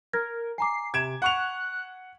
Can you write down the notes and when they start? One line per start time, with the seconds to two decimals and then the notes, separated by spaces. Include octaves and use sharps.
0.13 A#4 F6 G#6 A#6
0.58 G#5 A#5 D6 C7
0.94 C3 G#6 D7 E7
1.22 F#5 C#6 F#6 F7